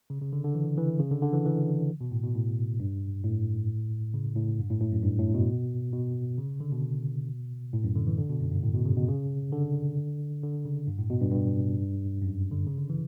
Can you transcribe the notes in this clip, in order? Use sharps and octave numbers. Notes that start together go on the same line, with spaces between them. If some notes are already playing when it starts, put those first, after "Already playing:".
C#3
C#3
D3
D3
E3
E3
C#3
D3
D3
E3
E3
B2
A2
B2
A2
G2
A2
C#3
A2
G2
A2
A2
F#2
G2
A2
B2
B2
C#3
D3
B2
A2
F#2
D3
E3
D3
B2
F#2
G2
A2
B2
C#3
B2
C#3
D3
D3
C#3
G2
A2
B2
G2
G2
F#2
D3
C#3
D3
E3